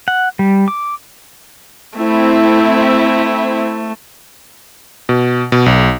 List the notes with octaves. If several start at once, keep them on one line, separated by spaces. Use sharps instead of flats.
F#5
G3
D6
A3 C4 E4
B2
B2
B1